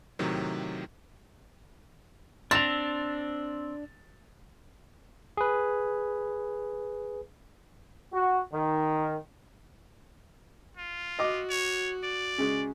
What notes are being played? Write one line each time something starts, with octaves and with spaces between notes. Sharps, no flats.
A2 C3 D#3 F#3
C4 D4 A6 F7
G#4 B4
F#4
D#3
F4
F#4 D#5 D6
C#5
D5
C#3 G#3